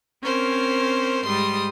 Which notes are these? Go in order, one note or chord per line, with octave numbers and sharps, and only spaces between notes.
C4 C#4 A#4 C5
G#2 G3 C6 D#6